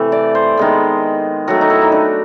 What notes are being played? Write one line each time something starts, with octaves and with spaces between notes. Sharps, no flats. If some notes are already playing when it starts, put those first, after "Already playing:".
Already playing: C3 E3 A3
D5
C5
D#3 G#3 B3
D#3 F#3 A3 F#4
D#4
E4
D#4
D4